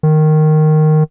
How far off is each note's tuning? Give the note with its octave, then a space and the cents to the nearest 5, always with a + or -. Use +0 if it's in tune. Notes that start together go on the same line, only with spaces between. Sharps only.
D#3 -10